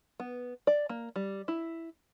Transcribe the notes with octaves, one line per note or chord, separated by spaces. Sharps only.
B3
D5
A#3
G3
E4